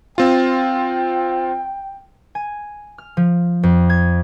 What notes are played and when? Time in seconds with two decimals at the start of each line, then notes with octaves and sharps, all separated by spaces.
0.18 C4 F4 G5
2.35 G#5
2.98 F6
3.17 F3
3.63 F2
3.90 G#6